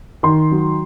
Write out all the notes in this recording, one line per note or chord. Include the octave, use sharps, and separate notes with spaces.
D#3 C6
F#3